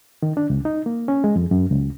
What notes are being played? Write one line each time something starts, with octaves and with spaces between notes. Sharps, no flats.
D#3
D4
C#2
D#4
A#3
C#4
G#3
F2
F#2
C#2